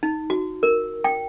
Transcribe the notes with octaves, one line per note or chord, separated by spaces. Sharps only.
D#4
F#4
A#4
G5